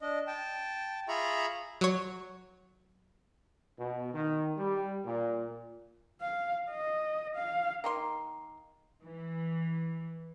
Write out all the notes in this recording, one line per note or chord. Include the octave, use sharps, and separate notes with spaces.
D4 D#5
G5 A5
F4 G#4 E5 A#5 B5 C#6
F#3 C#5
B2
D#3
G3
A#2
F5
D#5
F5
D#3 A#3 C6
E3